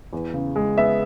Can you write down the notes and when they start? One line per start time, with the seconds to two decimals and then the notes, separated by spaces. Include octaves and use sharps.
0.13 E2
0.34 C#3
0.56 G#3
0.78 B3 E5